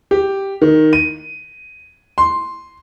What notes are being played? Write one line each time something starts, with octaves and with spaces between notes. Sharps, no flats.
G4
D#3
D#7
C6